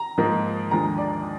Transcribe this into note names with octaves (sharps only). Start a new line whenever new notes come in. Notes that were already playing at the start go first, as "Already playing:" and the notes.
Already playing: A#5
G#2 F3 A#3 D#4
D#2 D3 F3 G#3 A#5
D5